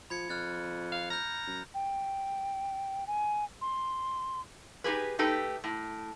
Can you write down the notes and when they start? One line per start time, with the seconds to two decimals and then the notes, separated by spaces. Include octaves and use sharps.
0.10 F3 B5 G#6 C#7
0.30 F2 F6 F#6 A6
0.92 F5
1.11 A#5 F6 G6
1.47 F#2
1.74 G5
3.07 G#5
3.61 C6
4.84 D#4 G4 G#4 B4
5.19 A3 D#4 G4 A4 B4
5.64 A2